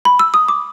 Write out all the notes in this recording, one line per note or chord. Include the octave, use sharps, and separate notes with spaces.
B5
E6
D#6
D6